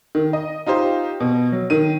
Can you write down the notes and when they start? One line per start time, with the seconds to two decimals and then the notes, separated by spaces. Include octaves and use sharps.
0.15 D#3
0.33 D#5
0.67 D#4 F4 G4 C5
1.20 B2
1.52 F#3
1.70 D#3 D#7